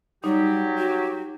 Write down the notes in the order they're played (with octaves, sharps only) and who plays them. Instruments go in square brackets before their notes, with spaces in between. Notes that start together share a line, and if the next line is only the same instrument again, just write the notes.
[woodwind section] F#3 G4 [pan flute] G3 [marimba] D#4
[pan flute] F#4